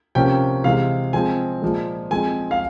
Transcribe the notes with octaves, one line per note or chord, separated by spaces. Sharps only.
C3 F3 A#3 C#4 G5
C3 E3 G#3 F5
F3 G#3 C4 G#5
A#2 F3 G#3
F3 G#3 C4 G#5
F5